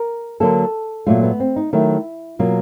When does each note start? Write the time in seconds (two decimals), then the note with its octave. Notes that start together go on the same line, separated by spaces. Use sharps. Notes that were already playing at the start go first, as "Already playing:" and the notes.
Already playing: A#4
0.40 D3 F#3 A#3 A4
1.07 A#2 F#3 A3 F4
1.23 B3
1.40 C4
1.56 D#4
1.73 D#3 F#3 A3 E4
2.39 B2 F#3 A#3 F4